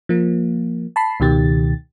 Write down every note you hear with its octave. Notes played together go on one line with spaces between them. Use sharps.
F3 A#3
A5 B5 C7
C#2 B2 D#3 G4 A6